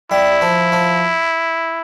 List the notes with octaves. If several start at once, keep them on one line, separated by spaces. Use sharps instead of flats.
G3 E4
F3
F3